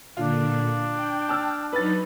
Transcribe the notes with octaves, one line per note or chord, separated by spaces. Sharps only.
A#2 D3 D4 F4
G5
A5 E6 F6
F#3 D#4 B4 A6